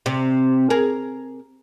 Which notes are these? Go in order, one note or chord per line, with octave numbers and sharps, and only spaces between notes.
C3
G#4 A#4